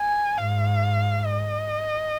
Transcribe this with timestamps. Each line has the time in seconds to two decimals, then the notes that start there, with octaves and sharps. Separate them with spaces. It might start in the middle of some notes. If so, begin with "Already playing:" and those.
Already playing: G#5
0.38 G#2 F5
1.25 D#5